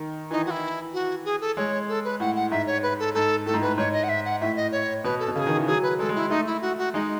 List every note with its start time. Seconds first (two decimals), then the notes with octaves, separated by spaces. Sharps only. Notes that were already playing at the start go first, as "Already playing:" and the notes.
Already playing: D#3
0.31 E3 D#4
0.46 F#4
0.51 E4
0.93 F#4
1.25 G#4
1.41 A4
1.57 G#3 C#5
1.89 A4
2.05 B4
2.20 A2 F#5
2.36 F#5
2.51 G#2 E5
2.67 C#5
2.83 B4
2.99 A4
3.14 G#2 A4
3.46 A2 A4
3.54 G#2
3.61 A2 B4
3.78 G#2 C#5
3.93 D#5
4.04 F#5
4.09 E5
4.25 F#5
4.41 A2 E5
4.56 D#5
4.72 C#5
5.04 B2 B4
5.19 A4
5.28 B2
5.35 C#3 G#4 A4
5.47 D#3
5.57 E3
5.67 F#3 G#4
5.83 B4
5.99 G#3 A4
6.09 G#3
6.15 E4
6.30 A3 D#4
6.47 E4
6.62 F#4
6.78 F#4
6.94 G#3 D#4